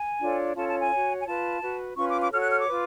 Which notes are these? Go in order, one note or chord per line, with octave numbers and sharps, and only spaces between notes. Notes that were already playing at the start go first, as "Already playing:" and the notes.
Already playing: G#5
D4 F4 A4 C#5
C#4 F4 A4 C#5 A5
A5
G#5
F#4 C#5
G#5
F4 B4 A5
F#4 B4
C#4 F4 B4 C#6
D6
D6
F#4 A4 C#5 F6
F#6
F6
D6
F4 B4